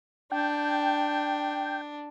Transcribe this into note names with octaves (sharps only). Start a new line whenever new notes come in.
D4 G5